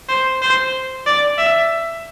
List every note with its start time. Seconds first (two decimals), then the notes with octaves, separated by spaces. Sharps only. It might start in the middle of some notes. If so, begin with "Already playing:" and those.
0.09 C5
0.42 C5
1.06 D5
1.38 E5